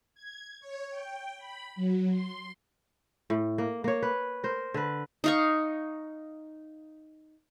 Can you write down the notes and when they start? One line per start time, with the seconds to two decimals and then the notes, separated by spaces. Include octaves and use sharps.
0.14 G#6
0.60 C#5
0.90 G5
1.38 B5
1.76 F#3
2.10 C6
3.30 A2
3.58 A#3
3.84 A#3 C#5
4.03 B4
4.44 A#4 C5
4.74 D3 B4
5.24 D#4 F5 C#6